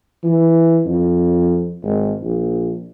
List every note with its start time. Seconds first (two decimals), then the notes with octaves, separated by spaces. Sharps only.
0.23 E3
0.86 F2
1.83 G#1
2.21 A#1